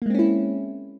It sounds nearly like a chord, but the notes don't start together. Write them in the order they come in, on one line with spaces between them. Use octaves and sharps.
A#3 G#3 C4 C#4 E4